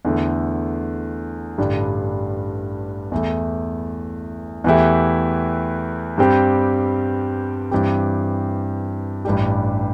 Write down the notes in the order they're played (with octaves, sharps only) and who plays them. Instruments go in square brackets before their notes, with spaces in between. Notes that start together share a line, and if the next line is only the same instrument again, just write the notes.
[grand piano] E2 D3 A3
A1 G2 D3 G3 D4
E2 E3 A3
E2 E3 A3 E4 G4
G2 G3 C4 G4
G2 E3 C4 G4
A1 G2 G3 D4 G4